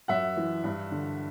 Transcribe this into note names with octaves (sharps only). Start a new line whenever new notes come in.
F#2 E5 F#5
E3
G2
D3